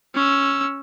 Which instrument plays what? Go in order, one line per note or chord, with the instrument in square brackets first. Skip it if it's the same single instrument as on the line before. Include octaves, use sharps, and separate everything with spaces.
[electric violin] C#4 E6